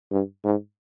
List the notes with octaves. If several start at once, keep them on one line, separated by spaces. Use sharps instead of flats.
G2
G#2